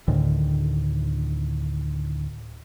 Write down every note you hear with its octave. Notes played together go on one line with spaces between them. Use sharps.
D2 A2 D3 D#3